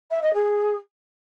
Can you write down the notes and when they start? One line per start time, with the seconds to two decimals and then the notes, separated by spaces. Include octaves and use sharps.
0.11 E5
0.22 D#5
0.34 G#4